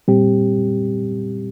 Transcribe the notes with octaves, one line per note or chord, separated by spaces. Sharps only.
A#2 G3 C4 G4